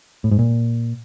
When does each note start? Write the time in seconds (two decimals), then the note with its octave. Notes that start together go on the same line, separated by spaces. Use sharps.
0.24 A2
0.31 G#2
0.39 A#2